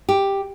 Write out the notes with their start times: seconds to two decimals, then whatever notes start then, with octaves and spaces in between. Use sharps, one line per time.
0.09 G4